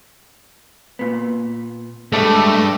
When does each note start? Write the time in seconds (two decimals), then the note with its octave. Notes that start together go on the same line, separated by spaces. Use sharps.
0.99 A#2 B3
2.12 G2 G#3 A3 A4 D5